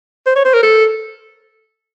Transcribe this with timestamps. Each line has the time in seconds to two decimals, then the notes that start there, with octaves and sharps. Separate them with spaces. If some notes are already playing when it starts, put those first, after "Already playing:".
0.26 C5
0.36 C#5
0.45 C5
0.54 A#4
0.63 A4